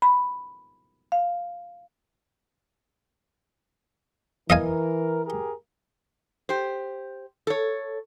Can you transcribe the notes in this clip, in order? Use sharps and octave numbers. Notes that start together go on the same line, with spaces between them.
B5
F5
E3 A#4 D#5 F5 G#5
G4 G#4 A#4
G4 C5
A4 C#5